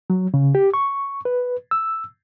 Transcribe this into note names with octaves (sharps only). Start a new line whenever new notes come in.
F#3
C#3
G4
C#6
B4
E6